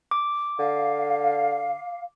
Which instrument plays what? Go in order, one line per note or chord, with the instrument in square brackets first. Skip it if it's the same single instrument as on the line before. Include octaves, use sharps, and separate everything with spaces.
[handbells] D6
[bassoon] D3 [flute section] F5